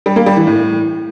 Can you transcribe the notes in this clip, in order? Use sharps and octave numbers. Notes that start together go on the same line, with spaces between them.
G3
A#3
G3
E3
A2